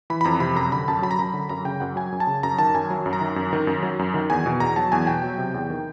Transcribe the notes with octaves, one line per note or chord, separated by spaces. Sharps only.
E3 B5
B5
F2 A#5
C3 B5
F#2 A#5
D3 B5
F#2 A5
F#3 B5
A#5
F#2 B5
D3
F#2 A#5
C#3 G5
F#2 F#5
F#3 G#5
F#2
A5
C#3
F#2 A#5
D#3 A5
F#2 G#5
F#3
F#2
A#5
D#3
F#2
D#3
F#2
F#3
F#2
D#3
E2 G#5
B2
E2 A#5
F#3 A5
E2 G#5
B2 G5
F#3
C3
E2
D#3